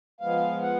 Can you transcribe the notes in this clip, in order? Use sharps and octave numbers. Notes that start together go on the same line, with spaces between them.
F3 G#3 B3 F5
F#5